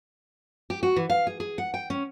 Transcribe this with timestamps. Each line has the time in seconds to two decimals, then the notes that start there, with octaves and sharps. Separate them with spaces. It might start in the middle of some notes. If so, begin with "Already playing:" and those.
0.70 G4
0.83 F#4
0.96 E3
1.10 F5
1.27 G#4
1.40 G#4
1.58 F#5
1.74 G5
1.90 C#4